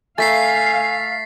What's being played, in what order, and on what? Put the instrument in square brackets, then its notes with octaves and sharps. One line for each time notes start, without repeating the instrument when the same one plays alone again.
[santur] A3 A#5 [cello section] F5 [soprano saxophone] G#5 [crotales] A6 B6 C7